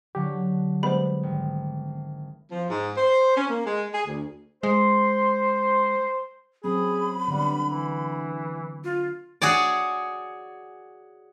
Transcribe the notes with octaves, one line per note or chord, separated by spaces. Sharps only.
D3 F#3 D4 G4
G3 G#3 B3 C5 B5
G#1
F3
G#2
C5
C#4
A#3
G#3
G#4
D2
G#3 C5 C6
F#3 C4 C#4 G#4 B5
D3 G3 B3 F#5
E3
F4
F#4 G#4 C#5 D5